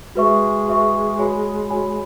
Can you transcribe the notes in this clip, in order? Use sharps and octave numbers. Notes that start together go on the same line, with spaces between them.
G#3 F#4 B4 E5 C#6
F#4 B4 E5 C#6
F#4 C#5 G#5 B5
F#4 C#5 G#5 B5